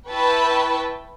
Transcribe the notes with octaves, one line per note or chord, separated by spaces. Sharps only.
E4 B4 G5 A5 B5 C#6